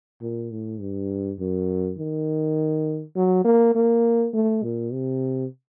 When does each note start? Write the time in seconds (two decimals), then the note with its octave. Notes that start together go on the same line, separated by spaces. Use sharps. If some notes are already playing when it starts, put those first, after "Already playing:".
0.21 A#2
0.51 A2
0.81 G2
1.39 F#2
1.98 D#3
3.16 F#3
3.45 A#3
3.75 A#3
4.34 A3
4.63 A#2
4.93 C3